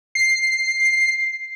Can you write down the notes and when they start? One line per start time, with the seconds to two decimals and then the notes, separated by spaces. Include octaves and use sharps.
0.15 C7